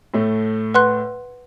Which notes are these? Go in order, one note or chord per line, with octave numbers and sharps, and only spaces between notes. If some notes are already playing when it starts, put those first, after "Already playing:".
A2 A3
B4 F#5 C6 F#6